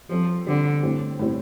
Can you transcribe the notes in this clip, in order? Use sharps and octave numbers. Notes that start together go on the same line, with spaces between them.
F3 G3 C4 A4
D3 G3 C4 A4
A2 G3 C4
A2 G3 C4